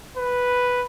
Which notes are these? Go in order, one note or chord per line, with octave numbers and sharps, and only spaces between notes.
B4